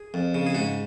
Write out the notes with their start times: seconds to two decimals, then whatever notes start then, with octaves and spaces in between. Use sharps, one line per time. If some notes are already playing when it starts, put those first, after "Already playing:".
Already playing: G#4
0.14 F2
0.35 C#3
0.46 G#4
0.54 G#2 F#4